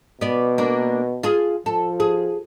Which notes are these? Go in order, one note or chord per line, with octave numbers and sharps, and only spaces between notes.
B2 B3 D5
A#3 D4
F4 G#4
F3 A4
G#4